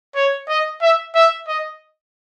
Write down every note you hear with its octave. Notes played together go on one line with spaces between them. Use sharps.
C#5
D#5
E5
E5
D#5